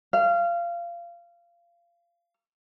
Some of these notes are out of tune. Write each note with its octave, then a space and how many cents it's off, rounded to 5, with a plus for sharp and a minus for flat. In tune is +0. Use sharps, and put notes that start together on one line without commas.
F5 -25